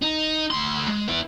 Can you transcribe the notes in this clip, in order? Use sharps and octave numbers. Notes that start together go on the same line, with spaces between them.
D#4
D2 C6
G#3
B3 E4